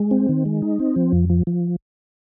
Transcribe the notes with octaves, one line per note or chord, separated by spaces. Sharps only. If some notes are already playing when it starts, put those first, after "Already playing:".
Already playing: G#3
C4
D#3
G#3
D#4
C4
F3
F2
F3
F3